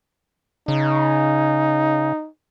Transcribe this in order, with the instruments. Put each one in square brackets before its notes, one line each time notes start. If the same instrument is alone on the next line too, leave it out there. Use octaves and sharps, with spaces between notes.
[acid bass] C#3 [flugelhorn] D#4